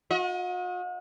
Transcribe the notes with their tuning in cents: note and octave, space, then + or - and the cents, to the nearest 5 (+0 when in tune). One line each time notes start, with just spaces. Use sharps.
F#4 -45 D#5 +30